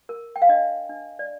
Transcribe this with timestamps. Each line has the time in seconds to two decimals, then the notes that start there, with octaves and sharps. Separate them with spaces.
0.09 A#4
0.36 G5
0.42 F5
0.49 D4 D#5
0.89 D4
1.19 D5